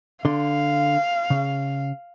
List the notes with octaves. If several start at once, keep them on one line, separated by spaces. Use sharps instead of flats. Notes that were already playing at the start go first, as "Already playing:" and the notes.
D3 F5 C6
C#3